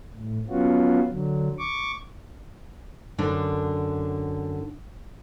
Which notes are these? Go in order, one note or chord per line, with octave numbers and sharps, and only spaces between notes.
A2
F#3 B3 C#4 F4 F#4
D3 F#3
C#6 D6
F#2 D3 D4